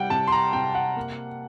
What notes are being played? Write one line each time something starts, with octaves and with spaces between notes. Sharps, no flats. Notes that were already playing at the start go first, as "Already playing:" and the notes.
Already playing: C3 G3 F#5 G5
C3 A5
C6
A#5
C3 G5
F#5
A#3